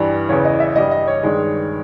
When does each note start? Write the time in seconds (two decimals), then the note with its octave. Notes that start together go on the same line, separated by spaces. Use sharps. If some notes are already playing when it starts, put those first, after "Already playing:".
Already playing: G2 E3 G3
0.29 E2 C#3 E3 C#5
0.45 D#5
0.60 E5
0.76 G2 G3 D#5
0.91 D#5
1.07 C#5
1.23 G2 D#3 G#3